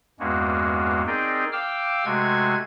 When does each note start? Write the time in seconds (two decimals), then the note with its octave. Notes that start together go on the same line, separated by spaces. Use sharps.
0.20 E2 G2 G#3 A#3 C#4 F#4
1.07 C4 D#4 G#4 A#4 D5 G5
1.52 F5 G5 D6 E6 F6
2.05 C3 G#3 A3 F#4 G#5 G#6